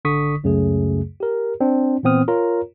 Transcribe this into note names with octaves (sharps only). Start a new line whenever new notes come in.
G#1 D3 C#6 D#6 B6
C#2 F#2 C#3 F#3 A3 G#4
G4 A#4
C4 D4
A#2 E3 B3 C4 D#6 F6
F4 A#4 C#5 A#5